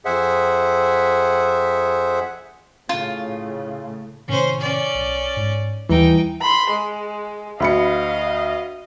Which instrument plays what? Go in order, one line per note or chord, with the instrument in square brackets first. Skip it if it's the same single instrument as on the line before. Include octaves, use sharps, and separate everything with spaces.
[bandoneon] F2 G#4 C5 E5 F#5
[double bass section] A2 C#3 A3 [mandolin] F4
[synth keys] A2 C3 D#3 [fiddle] C#4 C5
[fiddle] C#4 D5
[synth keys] B1
G#2
[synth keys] D#2 G3 A#5 [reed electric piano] E3 [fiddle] D#4 G5
[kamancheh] B5 C6
G#3
[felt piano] D2 B5 C#7 [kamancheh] D#5 F5